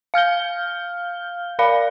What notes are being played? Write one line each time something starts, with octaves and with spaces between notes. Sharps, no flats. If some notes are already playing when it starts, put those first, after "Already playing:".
F5 F6 G6 G7
A#4 D5 F5 B5